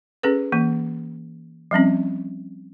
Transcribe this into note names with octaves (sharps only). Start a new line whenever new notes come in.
C#4 G#4 A4 B4
E3 A#3
F3 G3 C4 C#4